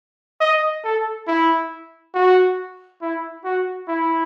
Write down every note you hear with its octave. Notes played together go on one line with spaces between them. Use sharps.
D#5
A4
E4
F#4
E4
F#4
E4